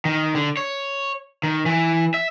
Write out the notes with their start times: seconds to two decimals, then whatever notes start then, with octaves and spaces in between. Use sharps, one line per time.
0.05 D#3
0.35 D3
0.57 C#5
1.43 D#3
1.66 E3
2.14 E5